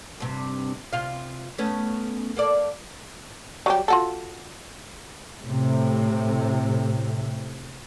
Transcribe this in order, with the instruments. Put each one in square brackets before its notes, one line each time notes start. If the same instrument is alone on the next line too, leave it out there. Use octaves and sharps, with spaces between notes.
[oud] G2 C3
C3 F4 F5
A3 B3 C#4
A#3 A4 D5
[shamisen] F#3 G3 G4
F4 F#4 A4
[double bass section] A2 C3